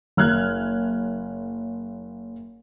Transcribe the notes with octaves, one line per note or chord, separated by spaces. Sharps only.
F#1 F6 F#6 G#6